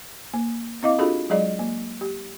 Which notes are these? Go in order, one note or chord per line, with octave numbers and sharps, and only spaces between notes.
A#3
C4 E4 D#5 F5 D6
D4 F4 F#4 G#4 A4 B5
F#3 G#3 G#4 D5 D#5
A#3
G4